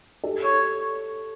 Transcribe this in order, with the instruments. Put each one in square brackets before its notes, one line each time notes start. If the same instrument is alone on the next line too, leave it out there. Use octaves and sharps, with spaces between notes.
[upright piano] G4 A4
[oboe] C#5